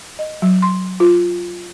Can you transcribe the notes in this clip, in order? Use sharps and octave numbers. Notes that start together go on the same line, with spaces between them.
D#5
F#3
C6
F4